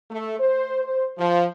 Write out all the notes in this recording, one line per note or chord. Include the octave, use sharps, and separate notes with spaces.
A3
C5
C5
F3